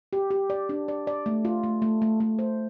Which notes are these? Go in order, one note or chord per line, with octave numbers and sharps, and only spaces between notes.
G4
G4
D5
D4
D5
D5
A3
F4
A3
A3
A3
A3
C5